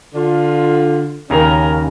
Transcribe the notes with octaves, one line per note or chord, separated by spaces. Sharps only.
D3 F4
D#2 C#3 C#4 A#4